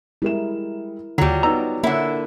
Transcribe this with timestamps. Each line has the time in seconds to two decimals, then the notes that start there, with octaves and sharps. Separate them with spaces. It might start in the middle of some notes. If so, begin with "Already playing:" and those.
0.22 G3 G#3 E4 A#4 E7
1.18 D#2 D3 F#3 G3 F4
1.43 B3 D#4 A#5 E6
1.83 D3 A#3 E4 A#4 C#5 F#5